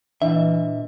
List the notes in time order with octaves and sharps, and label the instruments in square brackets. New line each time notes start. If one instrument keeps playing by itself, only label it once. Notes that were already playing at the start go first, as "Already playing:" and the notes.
[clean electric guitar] A#2 E5 [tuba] E3 [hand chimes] D4 D#5